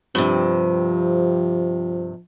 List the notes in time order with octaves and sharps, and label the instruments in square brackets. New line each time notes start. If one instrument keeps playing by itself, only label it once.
[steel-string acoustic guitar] G2 C3 [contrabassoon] F3